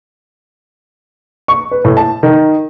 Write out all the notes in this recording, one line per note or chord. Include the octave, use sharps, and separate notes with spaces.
C#6
B4
A2
A5
D#3